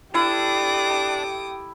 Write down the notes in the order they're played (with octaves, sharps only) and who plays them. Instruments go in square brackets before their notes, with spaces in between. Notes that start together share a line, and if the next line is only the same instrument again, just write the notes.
[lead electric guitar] D4 [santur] E4 [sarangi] G4 [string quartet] A4 D6 D#6